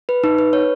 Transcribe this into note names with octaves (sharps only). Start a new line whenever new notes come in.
B4
D#4
B4
C#5